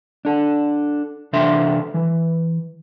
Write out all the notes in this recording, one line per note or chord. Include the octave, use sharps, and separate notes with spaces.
D4 A4
C3 E3 D4 A4 E5 C6
E3